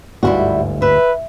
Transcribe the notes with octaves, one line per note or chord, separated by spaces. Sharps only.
G1 D2 G#2 G3 E4 F#4
B4 E5